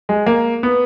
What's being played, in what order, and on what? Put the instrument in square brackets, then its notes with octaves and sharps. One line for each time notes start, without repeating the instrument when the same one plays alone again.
[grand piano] G#3
A#3
B3